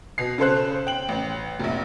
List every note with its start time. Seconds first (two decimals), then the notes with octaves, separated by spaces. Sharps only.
0.18 B2 C7
0.38 C#3 A4 C5 F#6
0.87 G5 F#7
1.09 A1
1.60 F1 A#1